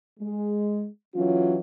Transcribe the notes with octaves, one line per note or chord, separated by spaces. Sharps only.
G#3
E3 F#3 C#4 F4